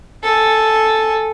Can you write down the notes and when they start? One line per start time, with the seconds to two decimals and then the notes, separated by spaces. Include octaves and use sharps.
0.24 A4 G#5